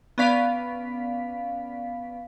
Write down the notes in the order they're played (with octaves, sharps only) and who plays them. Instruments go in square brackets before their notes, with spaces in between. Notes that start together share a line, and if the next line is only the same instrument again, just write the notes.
[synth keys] B3 C#4 D5 F5 B6